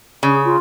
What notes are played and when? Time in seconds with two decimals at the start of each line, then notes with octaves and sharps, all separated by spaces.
0.23 C#3 G#4
0.44 F4